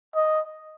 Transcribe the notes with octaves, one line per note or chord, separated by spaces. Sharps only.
D#5